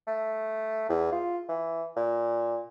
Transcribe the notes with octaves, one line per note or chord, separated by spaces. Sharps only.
A3
E2
F4
E3
A#2